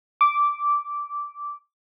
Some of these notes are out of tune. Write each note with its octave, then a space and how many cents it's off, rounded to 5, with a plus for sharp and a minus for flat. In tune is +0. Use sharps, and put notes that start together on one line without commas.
D6 -10